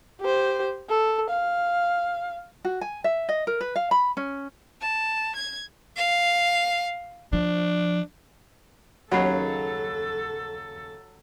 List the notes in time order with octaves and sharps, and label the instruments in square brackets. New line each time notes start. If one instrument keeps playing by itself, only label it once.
[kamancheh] G4 C5
A4
F5
[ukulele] F#4
G#5
E5
D#5
A#4
B4
F5
B5
C#4
[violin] A5
G#6
[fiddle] F5
[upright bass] F3 [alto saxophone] D4
[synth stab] D#2 C#3 [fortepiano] F#3 [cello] A4 [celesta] F#5 B5 C7